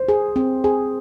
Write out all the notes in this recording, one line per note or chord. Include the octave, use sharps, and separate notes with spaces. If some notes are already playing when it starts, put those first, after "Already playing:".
Already playing: C5
G#4
C4
G#4